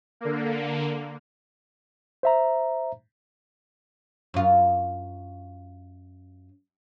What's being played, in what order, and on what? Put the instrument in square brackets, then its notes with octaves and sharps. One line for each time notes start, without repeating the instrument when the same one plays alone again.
[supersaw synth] D3 A#3
[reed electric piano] C5 E5 A#5
[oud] F#2 F4